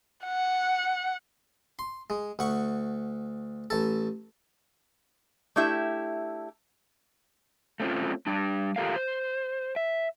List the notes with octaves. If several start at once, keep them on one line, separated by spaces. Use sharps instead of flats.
F#5
C6
G#3
D2 F#5 C#6
A1 A4
A3 D4 E4 G4 E5
A3 C4 C#4 F4
G3 D4
F4 G4 A4 A#4 F5
C5
E5